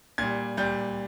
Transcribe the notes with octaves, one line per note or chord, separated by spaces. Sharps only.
A#2 G3 G#6
A#2 G3 G6